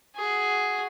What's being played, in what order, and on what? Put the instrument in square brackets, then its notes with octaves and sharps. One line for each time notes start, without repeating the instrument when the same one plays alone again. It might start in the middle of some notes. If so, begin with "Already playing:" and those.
[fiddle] F#4 G#4